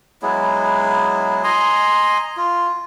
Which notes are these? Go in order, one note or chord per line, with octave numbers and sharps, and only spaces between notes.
F#3 G#3 B3 E4
D#5 G#5 A#5 C6
F4